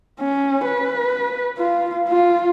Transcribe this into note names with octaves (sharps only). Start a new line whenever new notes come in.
C#4
B4
F4
F4